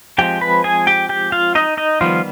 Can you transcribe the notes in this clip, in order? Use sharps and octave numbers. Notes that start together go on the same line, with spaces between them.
F3 G#3 C4 G4 G5
B4 B5
G#4 G#5
G4 G5
G4 G5
F4 F5
D#4 D#5
D#4 D#5
D#3 F3 G3 B3 F4